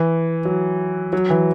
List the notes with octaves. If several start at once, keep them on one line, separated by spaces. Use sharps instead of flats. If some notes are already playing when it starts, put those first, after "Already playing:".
Already playing: E3
F#3
F#3
E3